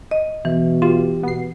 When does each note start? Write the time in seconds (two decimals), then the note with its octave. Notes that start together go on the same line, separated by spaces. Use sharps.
0.11 D#5
0.45 B2 E3
0.82 F4 G4
1.23 B2 B3 C7